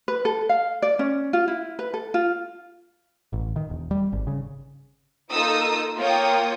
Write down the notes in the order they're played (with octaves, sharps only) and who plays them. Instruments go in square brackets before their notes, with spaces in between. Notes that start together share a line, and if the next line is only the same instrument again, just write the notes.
[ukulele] B4
A4
F5
D5
C#4
F4
E4
B4
A4
F4
[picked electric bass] A1
D#3
E1
G3
G#1
C#3
[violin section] A#3 D#4 F4 A4 D#6 E6
A#3 F4 C#5 G5 D#6